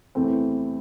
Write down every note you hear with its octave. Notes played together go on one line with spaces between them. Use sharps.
E2 C3 E3 A3 C4